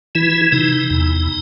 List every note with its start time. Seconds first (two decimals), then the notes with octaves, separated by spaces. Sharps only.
0.15 E3 E4
0.52 C3 D#4
0.90 E2